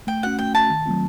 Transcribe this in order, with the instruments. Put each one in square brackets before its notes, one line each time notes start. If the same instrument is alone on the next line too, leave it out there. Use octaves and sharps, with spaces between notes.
[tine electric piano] A3 [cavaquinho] G5
[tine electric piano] C#4 F#4 [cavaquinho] F#5
[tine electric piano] A3 [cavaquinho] G5
[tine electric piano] C#4 F#4 [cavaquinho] A5
[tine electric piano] D#3
F#3 A3 C4 F4